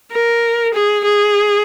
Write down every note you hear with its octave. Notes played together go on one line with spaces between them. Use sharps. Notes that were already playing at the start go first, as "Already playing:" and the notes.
A#4
G#4
G#4